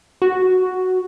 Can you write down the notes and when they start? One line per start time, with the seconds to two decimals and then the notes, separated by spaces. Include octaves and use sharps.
0.22 F#4